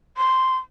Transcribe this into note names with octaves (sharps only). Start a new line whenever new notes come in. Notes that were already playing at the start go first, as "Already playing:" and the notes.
C6